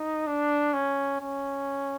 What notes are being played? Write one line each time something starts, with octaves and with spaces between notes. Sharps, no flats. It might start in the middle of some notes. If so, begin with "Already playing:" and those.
Already playing: D#4
D4
C#4
C#4